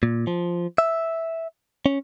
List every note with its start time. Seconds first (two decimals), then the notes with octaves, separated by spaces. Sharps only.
0.03 A#2
0.27 F3
0.78 E5
1.86 C#4